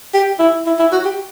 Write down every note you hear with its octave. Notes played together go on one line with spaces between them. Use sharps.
G4
E4
E4
E4
F#4
G4